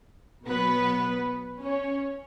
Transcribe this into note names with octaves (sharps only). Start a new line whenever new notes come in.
B2 F#3 B3 B4
C#4 C#5